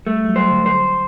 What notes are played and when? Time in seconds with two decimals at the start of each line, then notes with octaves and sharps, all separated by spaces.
0.07 G3 A3
0.24 G3
0.29 F#3
0.36 C5
0.51 D3
0.66 C5